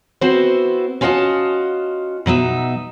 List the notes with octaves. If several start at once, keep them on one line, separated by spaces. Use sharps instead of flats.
B3 C4 E4 F#4 C5
C#4 F4 F#4 C#5 D#5 A5
B2 F#3 D#4 E5